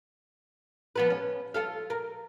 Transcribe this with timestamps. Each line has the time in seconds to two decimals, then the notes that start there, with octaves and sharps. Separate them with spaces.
0.96 F3 B3 B4
1.10 C#4
1.54 F4 A4 F5
1.90 A#4